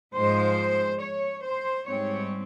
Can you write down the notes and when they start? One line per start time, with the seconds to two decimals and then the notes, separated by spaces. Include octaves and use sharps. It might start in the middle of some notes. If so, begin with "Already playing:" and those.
0.15 G#2 F3 G#3 C5
1.01 C#5
1.44 C5
1.86 G#2 G3 C4 C#5